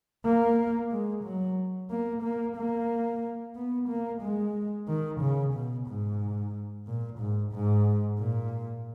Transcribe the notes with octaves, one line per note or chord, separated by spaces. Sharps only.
A#3
G#3
F#3
A#3
A#3
A#3
B3
A#3
G#3
D#3
C#3
B2
G#2
A#2
G#2
G#2
A#2